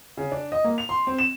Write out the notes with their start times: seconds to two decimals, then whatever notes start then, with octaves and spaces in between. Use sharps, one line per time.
0.17 C#3
0.31 D4
0.52 D#5
0.64 A#3
0.78 F7
0.89 C6
1.07 C4
1.19 E7